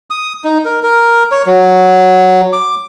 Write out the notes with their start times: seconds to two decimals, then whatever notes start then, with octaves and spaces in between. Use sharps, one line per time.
0.10 D#6
0.44 D#4
0.65 A#4
0.83 A#4
1.31 C#5
1.46 F#3
2.53 D6